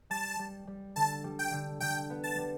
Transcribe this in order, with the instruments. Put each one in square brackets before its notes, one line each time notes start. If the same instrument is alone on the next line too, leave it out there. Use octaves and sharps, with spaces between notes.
[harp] G3 [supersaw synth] A5
[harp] G3
G3
[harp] D3 [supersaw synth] A5
[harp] G3
[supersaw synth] G5
[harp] D3
[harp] D3 [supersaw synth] G5
[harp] B3
[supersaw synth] A5
[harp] G3